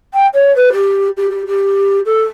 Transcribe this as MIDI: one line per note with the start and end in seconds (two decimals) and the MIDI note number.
0.14 0.27 79
0.34 0.54 73
0.56 0.69 71
0.73 1.08 67
1.17 1.30 67
1.30 1.43 67
1.46 1.99 67
2.05 2.23 69